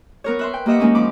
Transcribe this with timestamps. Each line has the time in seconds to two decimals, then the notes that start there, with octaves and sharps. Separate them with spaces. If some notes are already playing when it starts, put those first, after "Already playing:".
0.24 B3 A#4 C#5
0.39 B4 E5 C6
0.53 G5
0.66 A#3 G4 D#5 E5 F#5
0.80 G#3 A#3 C4 C#4 D#4
0.95 F3 B5 D6